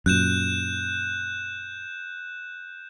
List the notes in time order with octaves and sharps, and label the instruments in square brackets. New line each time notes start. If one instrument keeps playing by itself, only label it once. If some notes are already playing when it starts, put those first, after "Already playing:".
[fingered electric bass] F#2 A#2 [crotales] F#6 G6 E7